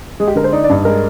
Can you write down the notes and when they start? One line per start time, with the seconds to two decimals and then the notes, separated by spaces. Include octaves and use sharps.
0.20 G#3 G#4
0.28 G4
0.36 D3 A#4
0.44 C5
0.52 D#4 D5
0.64 D5
0.70 G2
0.85 G#3 A#4